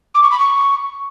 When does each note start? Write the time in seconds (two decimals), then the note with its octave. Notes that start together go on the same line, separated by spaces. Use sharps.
0.14 D6
0.23 C#6
0.31 B5
0.39 C#6